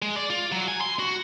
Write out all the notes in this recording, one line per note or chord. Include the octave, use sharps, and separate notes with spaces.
G#3
D5
F4
F#3
G#5
C6
F#4